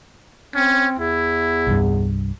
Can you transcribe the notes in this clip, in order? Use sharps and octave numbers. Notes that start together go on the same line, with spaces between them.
C4 C#4
E2 E4
C2 G2